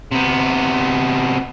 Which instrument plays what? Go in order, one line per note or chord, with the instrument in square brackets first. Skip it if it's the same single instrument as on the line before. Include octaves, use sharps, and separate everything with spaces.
[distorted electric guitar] C3 B3